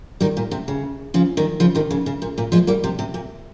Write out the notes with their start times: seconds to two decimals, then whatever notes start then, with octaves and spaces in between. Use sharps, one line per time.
0.21 D#3 G3
0.37 A#2
0.51 C3
0.68 C#3
1.14 C#3 F3
1.37 D#3 G3
1.60 C#3 F3
1.75 C3 D#3
1.91 C#3
2.06 C#3
2.22 A#2
2.38 A#2
2.52 F3 G#3
2.67 G3 A#3
2.84 C3
2.99 C3
3.14 A#2